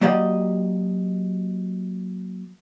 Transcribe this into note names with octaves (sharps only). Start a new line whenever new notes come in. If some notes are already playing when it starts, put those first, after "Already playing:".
F#3 A#3 G4 D5 D#5